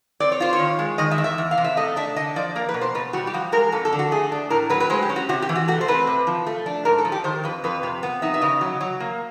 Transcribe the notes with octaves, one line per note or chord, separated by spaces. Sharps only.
C4 D5
C#5
F4 C5
C#5
D#3
G#3
D#3 D#5
E5
E2
E5
E2
F5
C3
E5
A3 D#5
D4 E5
D3 D#5
F3 D5
A#3 A#4
B4
B2
C5
B2 B4
G3 F#4
G4
F3 F#4
G#3 A#4
F2 A4
A4
D3
F#4
A3 G#4
D4
A2 A#4
F#3 B4
B4
G#3 C5
G4
C#4
F#4
C3 F#4
G4
E3
F#4
A3 F#4
C5
C4 B4
C3
F3
A3
D4
G#2 A#4
A4
F3
G4
D#3 C5
F2 B4
F2 B4
C3
B3
D#4 E5
E5
C#3 D#5
F#3
F#3
A#3